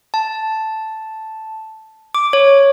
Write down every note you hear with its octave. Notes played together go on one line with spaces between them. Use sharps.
A5
D6
C#5